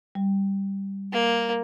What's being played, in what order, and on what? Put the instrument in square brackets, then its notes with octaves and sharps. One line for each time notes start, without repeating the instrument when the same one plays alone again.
[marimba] G3
[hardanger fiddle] A#3